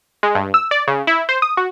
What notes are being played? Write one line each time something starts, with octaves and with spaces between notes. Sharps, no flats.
G#3
G2
E6
D5
C#3
E4
C5
D#6
F#4